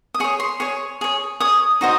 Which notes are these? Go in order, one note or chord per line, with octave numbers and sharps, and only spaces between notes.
D#6
G#4 C#5 C#6
C6
G#4 C#5 C#6
G#4 C#5
G#4 C#5 D#6
D#4 F#4 C5 D#5